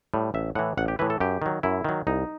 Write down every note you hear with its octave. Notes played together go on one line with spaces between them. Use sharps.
A2 G3
A1 E5
A2 E3 F#5
A1 F#5
G4
A2 E3 B4
A4
F#2 G4
D#3 F#3
F#2 E4
D#3 F#3
C2 D#4